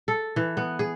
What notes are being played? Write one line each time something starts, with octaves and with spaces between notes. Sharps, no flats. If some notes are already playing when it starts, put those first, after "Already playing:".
A4
E3
B3
G#4